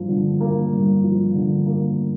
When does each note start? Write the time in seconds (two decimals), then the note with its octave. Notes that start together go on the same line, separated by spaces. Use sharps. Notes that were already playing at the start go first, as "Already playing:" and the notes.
Already playing: G2 F3 A#3
0.09 D3
0.41 A#3
0.73 G2
1.04 F3
1.35 D3
1.66 A#3